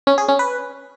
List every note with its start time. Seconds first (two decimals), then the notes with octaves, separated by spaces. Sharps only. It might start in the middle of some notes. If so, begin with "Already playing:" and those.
0.07 C#4
0.18 G#4
0.28 C#4
0.39 B4